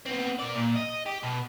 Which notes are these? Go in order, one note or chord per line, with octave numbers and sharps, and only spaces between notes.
B3 C4
A#4 D5
A#2
D#5
G4
B2